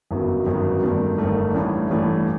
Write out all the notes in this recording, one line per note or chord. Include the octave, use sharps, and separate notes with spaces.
G1 F#2 D#3 F#3 B3
G1 F#2 D#3 F#3 B3
G1 G2 D#3 A3
G1 G2 D#3 A3
A1 G2 E3 A3
A1 G2 E3 A3